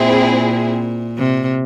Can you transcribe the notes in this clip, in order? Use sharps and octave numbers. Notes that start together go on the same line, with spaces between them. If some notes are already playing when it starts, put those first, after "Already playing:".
Already playing: A#2 C4 E4 G#4
C3